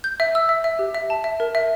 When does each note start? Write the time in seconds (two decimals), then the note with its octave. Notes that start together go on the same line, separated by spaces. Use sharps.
0.04 G6
0.20 E5
0.35 E6
0.49 E5
0.64 E5
0.79 G4
0.95 E5
1.10 A5
1.24 E5
1.40 A#4
1.55 E5